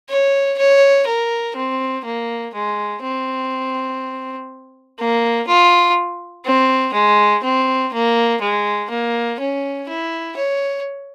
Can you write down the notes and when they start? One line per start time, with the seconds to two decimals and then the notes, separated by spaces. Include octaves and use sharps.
0.09 C#5
0.58 C#5
1.07 A#4
1.56 C4
2.05 A#3
2.54 G#3
3.03 C4
4.99 A#3
5.47 F4
6.45 C4
6.94 G#3
7.44 C4
7.93 A#3
8.41 G#3
8.90 A#3
9.40 C#4
9.88 E4
10.37 C#5